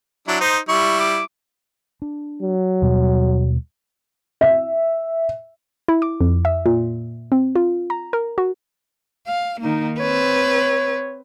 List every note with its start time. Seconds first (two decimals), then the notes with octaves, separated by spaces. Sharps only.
0.28 F#3 D4 E4
0.41 D#4 C5
0.69 G3 E4 C#6
1.00 D6
2.02 D4
2.43 F#3
2.82 D#2 B2 G3
4.41 E5
5.88 E4
6.02 D6
6.21 F2
6.45 E5
6.66 A#2
7.32 C4
7.56 F4
7.90 A#5
8.13 A#4
8.38 F#4
9.27 F5
9.60 D#3 A#3 D#4
10.00 C4 B4 C#5